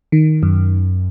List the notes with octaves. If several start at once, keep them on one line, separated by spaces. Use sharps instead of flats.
D#3
F#2